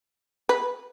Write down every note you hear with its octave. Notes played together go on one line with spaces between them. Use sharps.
B4